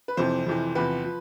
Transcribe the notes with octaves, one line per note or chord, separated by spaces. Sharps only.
B4
F2 C3 E3 C5
F2 C3 E3
E2 C3 F3 B4
F3